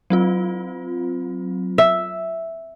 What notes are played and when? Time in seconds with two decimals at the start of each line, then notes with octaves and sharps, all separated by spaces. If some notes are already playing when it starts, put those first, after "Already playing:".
0.10 F#3 C4 F4
1.78 E5